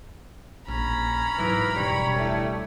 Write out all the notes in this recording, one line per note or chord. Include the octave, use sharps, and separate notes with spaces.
A#1 C#4 A#5 B5
G#2 E3 F#3 A#4
E1 C#2 G3 C#5
A3 E4